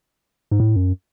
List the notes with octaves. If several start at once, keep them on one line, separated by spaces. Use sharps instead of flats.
G#2
A2
F#2